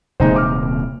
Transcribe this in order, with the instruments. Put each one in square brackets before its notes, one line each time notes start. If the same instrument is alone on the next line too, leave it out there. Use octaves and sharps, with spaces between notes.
[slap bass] D#1 C3 A#3 [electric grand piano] G#3 D#4 C5
[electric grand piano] D6 F6